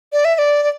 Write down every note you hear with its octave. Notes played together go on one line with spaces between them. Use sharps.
D5
E5
E5
D5
D5